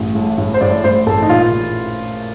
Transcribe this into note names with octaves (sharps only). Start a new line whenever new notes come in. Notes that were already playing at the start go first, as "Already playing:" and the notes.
Already playing: A1
A2
A2
C5
A2 D5
A2 C5
A1 A4
D#4
A#2 F4
A#2